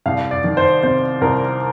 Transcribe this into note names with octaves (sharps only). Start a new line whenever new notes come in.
C2 F5
D5
D#3
C5
C3 C5
C2 A#4